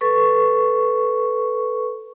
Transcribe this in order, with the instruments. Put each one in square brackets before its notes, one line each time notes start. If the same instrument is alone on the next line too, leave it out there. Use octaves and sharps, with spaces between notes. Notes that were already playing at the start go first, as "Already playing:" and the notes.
[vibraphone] A4 B4 C#6